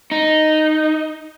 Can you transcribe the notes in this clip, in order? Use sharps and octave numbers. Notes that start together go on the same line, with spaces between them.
D#4